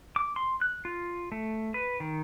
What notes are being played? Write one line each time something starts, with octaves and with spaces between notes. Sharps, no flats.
D6
C6
F#6
F4
A3
B4
D#3